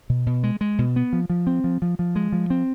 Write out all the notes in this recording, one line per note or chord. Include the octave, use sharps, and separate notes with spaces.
B2
B2
G#3
G#3
B2
B3
F3
F3
C4
F3
F3
F3
G#3
F3
C4